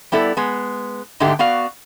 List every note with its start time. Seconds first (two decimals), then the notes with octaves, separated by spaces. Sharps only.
0.12 G3 B3 E4 A4 D5
0.37 G#3 B3
1.20 G#2 D3 G#3 A3 G4
1.39 B3 F#4 D5 F5